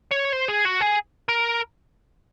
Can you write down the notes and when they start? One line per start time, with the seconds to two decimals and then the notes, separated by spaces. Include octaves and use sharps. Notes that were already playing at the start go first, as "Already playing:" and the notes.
0.11 C#5
0.32 C5
0.48 G#4
0.65 F#4
0.81 G#4
1.29 A#4